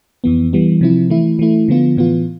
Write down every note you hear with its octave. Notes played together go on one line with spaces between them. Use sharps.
F2 E3 B3
E3 G3 B3
C3 F3 C4 E4
E3 A3 E4
E3 A3 E4
D3 F3 B3 F4
A2 E3 B3 F4